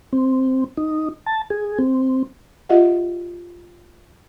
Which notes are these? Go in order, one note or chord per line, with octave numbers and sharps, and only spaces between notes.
C4
D#4
A5
G#4
C4
F4 G4 G#4 D#5 E5 F#5